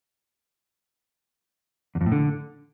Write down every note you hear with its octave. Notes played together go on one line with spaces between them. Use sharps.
E2
F2
A2
D3